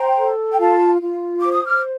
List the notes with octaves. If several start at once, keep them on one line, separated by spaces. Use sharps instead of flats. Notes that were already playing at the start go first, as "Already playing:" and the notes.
Already playing: C5 G5 A#5
A4
G5
F4 F5 A5
F4
C5 D6
D#6
D6 F6